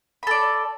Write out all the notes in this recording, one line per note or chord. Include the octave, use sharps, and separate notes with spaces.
A4 D5 B5